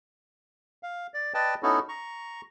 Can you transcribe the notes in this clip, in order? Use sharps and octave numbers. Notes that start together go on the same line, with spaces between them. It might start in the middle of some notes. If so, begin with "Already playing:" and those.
F5
D5
B4 D5 D#5 G5 A5
B3 C#4 D#4 E4 F#4 A4
A#5 C#6